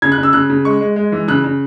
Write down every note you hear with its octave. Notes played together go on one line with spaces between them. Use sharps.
C#3 G#6
F#6
C#3
E6
C#3 F#6
C#3
G#3 C#6
G#3
G#3
E3
C#3 F#6
C#3